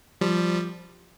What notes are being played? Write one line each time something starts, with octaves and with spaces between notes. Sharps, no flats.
F3 G3